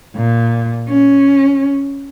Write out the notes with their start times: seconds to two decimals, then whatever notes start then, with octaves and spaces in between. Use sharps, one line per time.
0.17 A#2
0.89 C#4